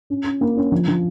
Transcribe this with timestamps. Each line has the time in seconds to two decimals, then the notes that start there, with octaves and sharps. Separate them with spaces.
0.10 C#4
0.26 C#4
0.41 A#3
0.57 C#4
0.72 F3
0.88 F3